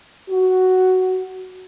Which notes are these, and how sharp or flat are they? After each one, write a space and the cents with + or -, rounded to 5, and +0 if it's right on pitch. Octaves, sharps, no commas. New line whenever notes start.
F#4 +5